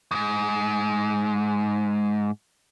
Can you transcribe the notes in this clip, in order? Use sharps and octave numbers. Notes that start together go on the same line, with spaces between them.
F2 G#2